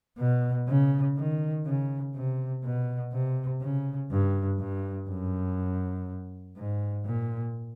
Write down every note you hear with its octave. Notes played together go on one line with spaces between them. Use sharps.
B2
C#3
D#3
C#3
C3
B2
C3
C#3
G2
G2
F#2
G#2
A#2